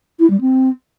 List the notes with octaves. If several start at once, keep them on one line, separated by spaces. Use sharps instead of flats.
E4
G3
C4